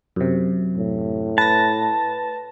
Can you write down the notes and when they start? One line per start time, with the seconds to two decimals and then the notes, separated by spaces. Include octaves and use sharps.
0.16 F#2 C3
0.77 A2
1.38 B4 A5 A#6